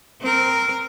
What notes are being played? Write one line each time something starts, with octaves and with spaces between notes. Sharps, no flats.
C4 A#4